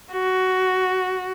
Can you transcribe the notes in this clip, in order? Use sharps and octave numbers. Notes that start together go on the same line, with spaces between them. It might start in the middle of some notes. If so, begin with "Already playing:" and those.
F#4